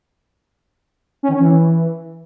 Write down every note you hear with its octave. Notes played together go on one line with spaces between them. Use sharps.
C#4
D#3
C#4
E3